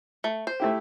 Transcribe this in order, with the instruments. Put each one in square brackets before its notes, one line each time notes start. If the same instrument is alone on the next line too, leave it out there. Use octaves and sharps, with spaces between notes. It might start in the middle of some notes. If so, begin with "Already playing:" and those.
[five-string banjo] A3
C5
[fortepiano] A3 E4 G4